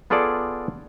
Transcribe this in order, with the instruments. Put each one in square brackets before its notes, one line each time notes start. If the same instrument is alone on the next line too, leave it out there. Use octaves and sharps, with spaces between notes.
[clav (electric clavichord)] B3 F4 G#4 A4 D5